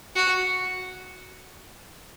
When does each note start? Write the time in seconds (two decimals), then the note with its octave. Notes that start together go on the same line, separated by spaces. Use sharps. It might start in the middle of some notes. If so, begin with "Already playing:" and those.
0.16 F#4